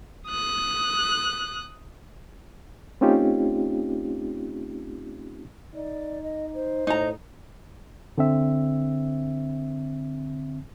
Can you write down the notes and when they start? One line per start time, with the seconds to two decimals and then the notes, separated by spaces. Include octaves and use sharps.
0.28 D#6 F#6
3.01 A3 C4 C#4 D#4 F4 G4
5.75 D#4 D5
6.23 D#5
6.54 C5
6.87 A2 D#4 A#5
8.18 D3 C4 E5